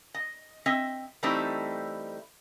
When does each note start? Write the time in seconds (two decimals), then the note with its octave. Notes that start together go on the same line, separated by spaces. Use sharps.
0.14 D#5
0.66 C4 D#5 E5
1.23 E3 G3 A3 C4 D#4 E4